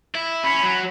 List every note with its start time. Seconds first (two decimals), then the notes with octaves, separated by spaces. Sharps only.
0.15 E4
0.43 C#4 B5
0.63 F#3